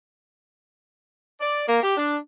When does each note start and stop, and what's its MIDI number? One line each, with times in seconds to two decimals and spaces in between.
1.40 1.63 74
1.68 1.79 58
1.82 1.95 67
1.97 2.16 62